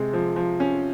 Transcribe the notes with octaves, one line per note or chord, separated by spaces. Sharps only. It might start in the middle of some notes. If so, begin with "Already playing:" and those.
Already playing: C3 G#3
F3
F3
C#4